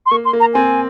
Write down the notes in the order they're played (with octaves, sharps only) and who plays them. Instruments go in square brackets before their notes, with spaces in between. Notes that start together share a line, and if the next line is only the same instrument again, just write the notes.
[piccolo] C6
[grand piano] A#3 [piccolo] C#6
[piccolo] C6
[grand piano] A#3
[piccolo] A#5
[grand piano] C4 [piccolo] G#5